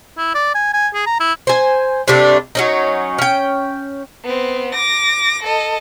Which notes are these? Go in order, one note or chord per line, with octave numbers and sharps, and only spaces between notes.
E4
D5
G#5
G#5
G#4
A#5
E4
C5 G#5
C3 G3 A3 D4
F#3 C#4 D#4
C#4 G5
B3 C4
D6 A#6
A4 D#5